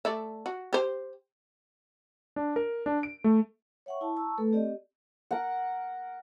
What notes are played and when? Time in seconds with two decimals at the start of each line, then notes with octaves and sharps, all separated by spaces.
0.05 A3 D5 E5
0.46 F#4
0.73 G4 C5
2.36 D4
2.56 A#4
2.86 D4
3.03 D7
3.24 A3
3.86 C#5 E5 F#5 G5 C#6
4.01 E4 A5 C#6
4.16 A5 A#5 C#6 E6
4.37 A3 A4 B4
4.52 C4 G4 D5 D#5
5.31 A#4 F#5